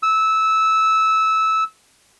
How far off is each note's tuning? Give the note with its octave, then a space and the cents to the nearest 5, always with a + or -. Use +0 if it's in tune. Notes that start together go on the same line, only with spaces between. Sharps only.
E6 -15